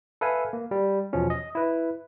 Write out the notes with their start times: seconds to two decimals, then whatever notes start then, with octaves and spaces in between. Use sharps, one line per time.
0.21 A4 B4 E5 F5 G#5
0.53 A#3
0.71 G3
1.13 E2 B2 F3 C#4
1.30 D#5
1.55 E4 B4